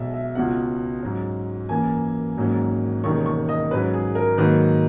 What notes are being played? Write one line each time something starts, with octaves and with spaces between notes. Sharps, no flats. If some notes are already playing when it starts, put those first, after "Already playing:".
Already playing: B1 B2 G#3 E5
E5
C#2 B2 G#3 B3 F#5
G#2 F#3 C#4
F#2 E3 A#3 G#5
G#1 G#2 F#3 A#3 C#4
E1 D#2 D#3 G#3 C#4 C#6
C#6
D#5
G#2 F#3 C#4 B4
G#4
A#4
G#2 D#3 F#3 A#3 B4